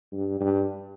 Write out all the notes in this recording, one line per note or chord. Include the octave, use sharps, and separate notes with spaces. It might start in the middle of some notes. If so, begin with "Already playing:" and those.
G2
G2